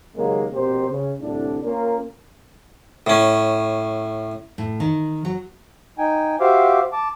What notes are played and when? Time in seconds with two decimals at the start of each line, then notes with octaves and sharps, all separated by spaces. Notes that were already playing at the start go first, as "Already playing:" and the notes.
0.16 D#2 C#3 F#3 G#3 A#3
0.53 A#1 B2 C4 G4 A#4 C5
0.88 C#3
1.20 C2 A2 D3 D4
1.63 A#3 C#4 F4 A#4
3.07 A2 C#4
4.58 A2
4.80 D#3
5.25 F#3
5.98 D#4 G5 G#5
6.40 F#4 G4 C5 E5 F5 D6
6.93 A5 D6